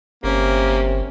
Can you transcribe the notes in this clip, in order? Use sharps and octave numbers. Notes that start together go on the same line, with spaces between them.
G1 C3 A#3 C#4